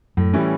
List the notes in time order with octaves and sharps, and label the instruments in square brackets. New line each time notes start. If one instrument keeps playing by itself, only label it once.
[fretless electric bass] F#2 [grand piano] A2
[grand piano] E3 G3 C#4 E4